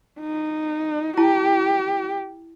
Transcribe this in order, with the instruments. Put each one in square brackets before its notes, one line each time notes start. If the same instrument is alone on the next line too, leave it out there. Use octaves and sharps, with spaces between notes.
[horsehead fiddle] D#4
[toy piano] E4 A5 A#5 [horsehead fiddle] G4